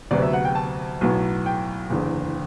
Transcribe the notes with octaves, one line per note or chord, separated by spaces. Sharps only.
D2 C3 F#3 B3 D5
E5
F#5
G5
A5
B1 A2 F#3 B3
G5
F#1 E2 D3